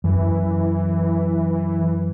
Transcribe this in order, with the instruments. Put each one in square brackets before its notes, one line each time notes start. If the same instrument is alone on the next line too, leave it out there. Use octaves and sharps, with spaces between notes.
[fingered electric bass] F#2 [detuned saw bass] E3